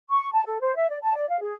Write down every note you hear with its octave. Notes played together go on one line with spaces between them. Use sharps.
C#6
A5
A4
C5
E5
D5
A5
D5
F5
G#4